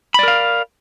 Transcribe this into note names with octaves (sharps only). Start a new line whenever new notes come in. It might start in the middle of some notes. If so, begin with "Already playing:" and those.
A#4 D5 F5 B5